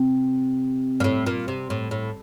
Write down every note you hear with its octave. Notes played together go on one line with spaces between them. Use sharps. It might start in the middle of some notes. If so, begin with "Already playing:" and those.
Already playing: C3
A#2
A2
A#2
C3
A2
A2